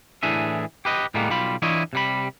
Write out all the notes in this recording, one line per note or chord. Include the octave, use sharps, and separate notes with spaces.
A2 E3 D4 G#4 E5
G4 B4 D#5
A2 G3 G#3 A#3 B3
B1 G3 F4 B5
E3 D4 E4 F4 C#5 D#5
C3 G3 B5